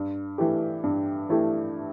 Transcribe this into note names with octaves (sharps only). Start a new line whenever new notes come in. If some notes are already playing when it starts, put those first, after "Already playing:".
Already playing: G2
E3 A3 E4 G4
G2
E3 A3 E4 G4